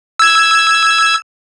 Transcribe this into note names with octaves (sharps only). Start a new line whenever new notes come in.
E6 G#6